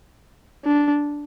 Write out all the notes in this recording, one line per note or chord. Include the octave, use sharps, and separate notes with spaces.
D4